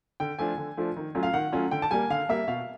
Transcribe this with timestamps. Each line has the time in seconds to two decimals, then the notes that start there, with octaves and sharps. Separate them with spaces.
0.20 D3 G5
0.39 F3 A3 D4 F4 G#5
0.58 D3
0.77 F3 A3 D4 F4
0.96 D#3
1.15 F#3 A3 C#4 F4
1.23 F5
1.33 D#3 F#5
1.52 F#3 A3 C#4 F4
1.71 D3 G5
1.82 A5
1.91 G3 A#3 G#5
2.10 D3 F5
2.29 G3 A#3 E5
2.48 B2 F5